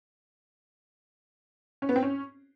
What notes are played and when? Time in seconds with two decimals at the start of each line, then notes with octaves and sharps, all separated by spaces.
1.82 C#4
1.89 B3
1.96 C4
2.02 C#4